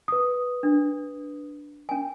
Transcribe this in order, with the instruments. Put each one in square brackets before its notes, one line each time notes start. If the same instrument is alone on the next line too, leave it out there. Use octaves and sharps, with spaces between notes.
[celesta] B4 D#6
[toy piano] D4
C#4 G#5